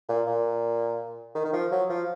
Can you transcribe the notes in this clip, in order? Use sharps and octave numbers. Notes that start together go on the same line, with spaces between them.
A#2
A#2
D#3
D#3
F3
F#3
F3